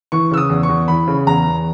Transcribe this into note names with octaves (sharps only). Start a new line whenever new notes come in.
E3 C#6
C#3 E6
D#6
E2
C#6
E2
E3 B5
C#3
E2 A#5
E2